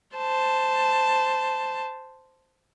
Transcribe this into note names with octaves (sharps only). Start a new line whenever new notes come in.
C5 A5